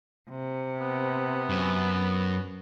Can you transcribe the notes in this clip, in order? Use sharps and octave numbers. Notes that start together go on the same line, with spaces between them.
C3
B3
F#2